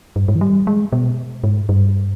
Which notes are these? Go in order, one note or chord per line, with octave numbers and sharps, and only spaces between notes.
G2
G#2
E3
G3
G#3
B2
G#2
G2